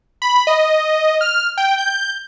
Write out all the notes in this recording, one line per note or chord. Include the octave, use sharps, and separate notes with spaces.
B5
D#5
F6
G5
G6